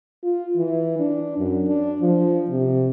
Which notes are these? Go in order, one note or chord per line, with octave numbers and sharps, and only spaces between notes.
F4
E3
D4
F#2
D4
F3
C3